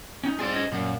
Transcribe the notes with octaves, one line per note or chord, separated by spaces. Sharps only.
C#4 D#4
C4 F4 G#4 C5 D5
C#4 C#5 D#5
F#2 A#2